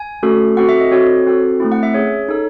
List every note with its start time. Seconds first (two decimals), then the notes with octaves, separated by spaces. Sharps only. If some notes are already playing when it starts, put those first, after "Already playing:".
Already playing: G#5
0.23 A3 C#4 F#4 A4
0.57 C4 F#4 A4 F#5
0.69 E5
0.80 D#5
0.92 C4 F#4 A4 C#5
1.26 C4 F#4 A4
1.60 A3 C4 E4
1.72 F#5
1.83 E5
1.94 C#4 G#4 C#5
2.28 D#4 A4